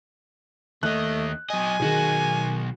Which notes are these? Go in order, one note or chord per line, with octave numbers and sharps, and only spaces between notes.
D#2 A3 D#5 F#6
F#3 D#5 G#5
B1 D#3 F#4 G#4